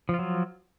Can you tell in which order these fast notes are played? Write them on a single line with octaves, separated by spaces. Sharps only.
F3 F4 F#3